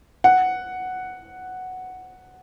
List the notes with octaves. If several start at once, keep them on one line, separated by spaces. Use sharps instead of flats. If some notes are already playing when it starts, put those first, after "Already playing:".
F#5